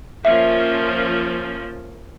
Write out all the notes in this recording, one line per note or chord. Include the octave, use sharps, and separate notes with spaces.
F3 A#3 C#4 E5